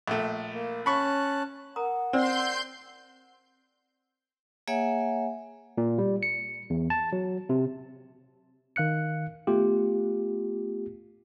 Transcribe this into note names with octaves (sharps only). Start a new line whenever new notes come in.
A#1 A3
A#3
C#4 A5 B5 C#6 F#6
A#4 F#5 A#5 D#6
C4 C5 D5 C6 G6
A#3 G#4 C#5 E5 F#5 G#5
A#2
G3
C#7
E2
A5
F#3
C3
D#3 F5 F#6 C#7
A3 B3 F4 G4